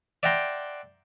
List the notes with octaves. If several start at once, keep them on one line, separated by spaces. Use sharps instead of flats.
D5 E5 F#5 G5 A#5 C6